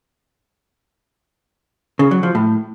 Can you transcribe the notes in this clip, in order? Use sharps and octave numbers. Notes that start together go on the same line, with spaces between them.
C#3
F#3
F3
A2